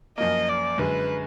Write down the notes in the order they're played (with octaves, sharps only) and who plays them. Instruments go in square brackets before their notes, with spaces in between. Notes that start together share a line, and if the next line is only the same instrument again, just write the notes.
[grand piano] F#2 F3 A#3 [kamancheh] D#5
[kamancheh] D5
[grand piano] F#2 D3 G#3 [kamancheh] B4